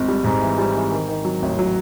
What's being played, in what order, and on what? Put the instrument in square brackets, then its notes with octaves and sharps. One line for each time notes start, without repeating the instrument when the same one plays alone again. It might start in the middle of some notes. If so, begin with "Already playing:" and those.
Already playing: [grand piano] G#1
G3
G#2
E3
G3
E3
D#3
D#3
F#3
A1
F#3